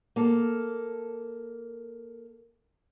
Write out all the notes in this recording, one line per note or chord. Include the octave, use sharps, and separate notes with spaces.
A#3 A4